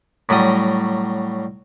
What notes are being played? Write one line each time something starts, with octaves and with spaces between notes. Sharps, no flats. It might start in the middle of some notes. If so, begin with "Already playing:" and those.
A2 F#3 G3 D#6